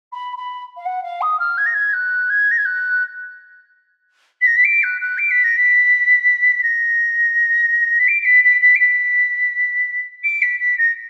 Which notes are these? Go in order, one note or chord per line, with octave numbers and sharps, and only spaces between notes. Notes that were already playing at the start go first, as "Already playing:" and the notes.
B5
B5
F5
F#5
F5
D#6
F6
G#6
A#6
G#6
F#6
G#6
A#6
G#6
F#6
B6
A#6
B6
D7
F#6
F#6
D7
B6
A#6
B6
A#6
B6
D7
D7
B6
B6
B6
D7
B6
D7
B6
B6
A#6